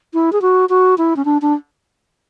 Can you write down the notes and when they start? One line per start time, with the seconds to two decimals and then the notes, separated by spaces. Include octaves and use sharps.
0.14 E4
0.33 G#4
0.42 F#4
0.69 F#4
0.98 E4
1.16 C#4
1.25 D4
1.42 D4